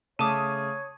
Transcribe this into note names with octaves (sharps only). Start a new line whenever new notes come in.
C#3 A3 C#5 A5 D6 D#6 D#7